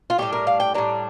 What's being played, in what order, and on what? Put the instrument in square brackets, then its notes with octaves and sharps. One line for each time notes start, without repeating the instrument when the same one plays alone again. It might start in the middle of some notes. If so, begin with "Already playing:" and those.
[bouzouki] F4
A2 G3 D4 G4
A#4
F5
G5
A2 G3 D4 A#5